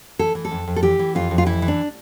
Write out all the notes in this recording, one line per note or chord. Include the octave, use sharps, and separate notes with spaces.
E3 A4
E3
A4
F2
F2
A4
E3 G4
E3
F2 F4
F2
F4
E3 E4
E3
D4